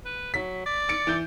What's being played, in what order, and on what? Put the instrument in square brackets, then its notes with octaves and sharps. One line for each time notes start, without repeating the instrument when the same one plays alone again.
[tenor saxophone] B4
[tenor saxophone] F#3 [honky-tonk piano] B6
[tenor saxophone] D5
[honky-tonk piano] A6 C#7 D7
E3 G6